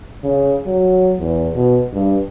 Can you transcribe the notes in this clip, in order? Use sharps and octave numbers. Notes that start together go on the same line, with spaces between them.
C#3
F#3
E2
B2
G2